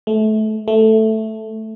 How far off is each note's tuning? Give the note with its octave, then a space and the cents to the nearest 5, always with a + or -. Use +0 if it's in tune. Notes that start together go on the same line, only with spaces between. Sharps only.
A3 -25
A3 +0